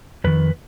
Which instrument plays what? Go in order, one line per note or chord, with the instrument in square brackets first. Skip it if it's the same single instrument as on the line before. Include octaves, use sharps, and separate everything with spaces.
[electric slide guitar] F2 D#3 B4